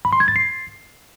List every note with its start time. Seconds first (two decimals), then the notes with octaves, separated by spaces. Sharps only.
0.05 B5
0.13 C6
0.20 G#6
0.28 A6
0.36 C7